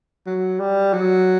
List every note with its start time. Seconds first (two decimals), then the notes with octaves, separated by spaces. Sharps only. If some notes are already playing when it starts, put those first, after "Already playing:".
0.26 F#3
0.60 G3
0.93 F#3